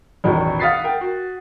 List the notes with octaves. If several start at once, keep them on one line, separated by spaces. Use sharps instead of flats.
A1 E2 B2 D#3
F5 F#5 D#6 A6 B6 C7
A#4 G5
F#4